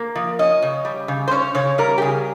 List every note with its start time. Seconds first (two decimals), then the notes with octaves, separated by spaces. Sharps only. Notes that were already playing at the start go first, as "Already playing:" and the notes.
Already playing: A#3
0.15 F3
0.39 C#4 D#5
0.62 C#3
0.85 G3
1.08 C#3
1.28 C5
1.31 C#4 C#5
1.55 C#3 C#5
1.78 G3 A#4
1.98 G4
2.02 C#3 G#4